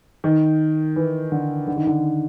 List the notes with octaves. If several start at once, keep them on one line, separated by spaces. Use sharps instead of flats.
D#3
E3
D3
D3
D#3
D3